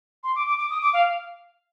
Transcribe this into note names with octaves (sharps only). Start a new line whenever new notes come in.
C6
D6
D6
D6
D#6
D6
F5